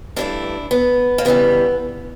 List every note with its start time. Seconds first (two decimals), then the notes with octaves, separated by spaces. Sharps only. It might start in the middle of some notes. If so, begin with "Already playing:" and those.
0.16 G2 E3 A3 D4 E4
0.71 B3
1.18 A#3
1.25 F2 C#3 E3 G3 B3